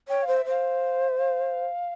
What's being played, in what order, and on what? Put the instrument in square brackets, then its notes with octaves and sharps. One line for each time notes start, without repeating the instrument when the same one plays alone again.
[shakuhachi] C#5 [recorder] G5
[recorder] F5
[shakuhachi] C5
[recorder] E5
[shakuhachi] C5 [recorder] F5
[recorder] E5
F5